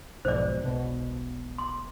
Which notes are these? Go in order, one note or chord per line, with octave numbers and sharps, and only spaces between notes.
B1 F2 G#2 C5 D5
E1 B1 B2
C6